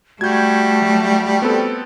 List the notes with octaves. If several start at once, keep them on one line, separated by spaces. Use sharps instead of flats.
G3 A3 F#4 G6 G#6
F#3
B3 C4 A4